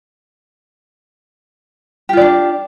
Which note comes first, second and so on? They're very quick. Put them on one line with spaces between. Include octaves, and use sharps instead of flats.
G4 F4 D5 D4